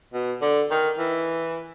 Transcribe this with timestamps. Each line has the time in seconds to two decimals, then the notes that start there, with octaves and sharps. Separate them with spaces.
0.13 B2
0.41 D3
0.71 D#3
0.98 E3